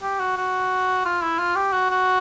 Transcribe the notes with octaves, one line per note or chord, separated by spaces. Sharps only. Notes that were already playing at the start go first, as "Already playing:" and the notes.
G4
F#4
F#4
F4
E4
F4
G4
F#4
F#4